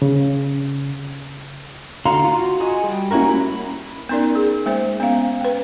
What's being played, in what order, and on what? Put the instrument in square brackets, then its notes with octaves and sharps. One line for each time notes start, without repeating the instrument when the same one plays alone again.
[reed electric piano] C#3
[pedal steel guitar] D3 F#4 F5 A#5 C6
F4 F#4
F#4 G#4 D#5 G#5 D#6
G3
A#3 C#4 E4 F#4 A#4
B5
[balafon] B3 C#4 D#4 A#4 D5
G#4
G#3 A#3 C5 E5
B3 C#4 F5
B4 G5